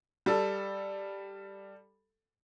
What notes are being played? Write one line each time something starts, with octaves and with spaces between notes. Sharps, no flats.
G3 A4